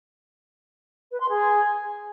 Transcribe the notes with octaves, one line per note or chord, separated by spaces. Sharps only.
B4
C6
G#4